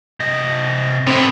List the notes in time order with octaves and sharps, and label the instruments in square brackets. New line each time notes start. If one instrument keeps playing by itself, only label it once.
[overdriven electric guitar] C3 D#5
[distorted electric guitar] A2 B3 [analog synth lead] C4